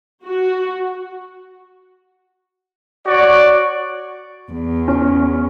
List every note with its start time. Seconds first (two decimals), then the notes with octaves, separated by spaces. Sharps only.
0.24 F#4
3.06 F#4 C#5 D5
4.52 E2
4.88 C#4